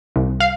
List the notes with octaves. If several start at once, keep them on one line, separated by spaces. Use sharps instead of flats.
C2
F5